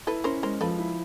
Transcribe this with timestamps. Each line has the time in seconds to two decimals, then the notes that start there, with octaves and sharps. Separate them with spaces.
0.07 E4 A4 B4
0.24 C#4 A#4 C5
0.43 G#3 A#4 C5
0.61 F3 A4 B4
0.78 E4